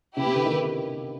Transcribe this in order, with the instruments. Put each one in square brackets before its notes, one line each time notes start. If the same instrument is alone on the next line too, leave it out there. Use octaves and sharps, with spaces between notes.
[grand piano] C#3 [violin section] E4 G4 B4
[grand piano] C3
D3
D#3